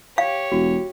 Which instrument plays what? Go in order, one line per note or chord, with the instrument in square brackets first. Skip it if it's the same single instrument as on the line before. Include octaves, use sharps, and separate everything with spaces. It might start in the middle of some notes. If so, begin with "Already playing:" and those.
[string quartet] G4 C#5 [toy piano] F5
[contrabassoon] E1 [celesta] F#4